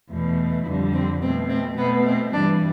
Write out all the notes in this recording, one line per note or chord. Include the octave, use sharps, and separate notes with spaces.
E2 B2 A3
F2 D3 G3 E4
C4
B2 A3 C4
C4
B2 A3 B3
C4
G2 E3 G3 D4